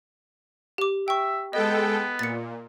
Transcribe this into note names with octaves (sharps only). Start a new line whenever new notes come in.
G4 D6
E5 G5 C#6
G#3 B3 A4 D#5 G5
A#2 A6 C#7